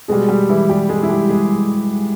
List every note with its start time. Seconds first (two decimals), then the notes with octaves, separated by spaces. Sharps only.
0.08 B2 G3 G#3 G#4
0.29 G3 G4
0.49 E3 E4
0.69 G3 G4
0.89 G#3 G#4
1.03 E4
1.09 G3 G4
1.29 G#3 G#4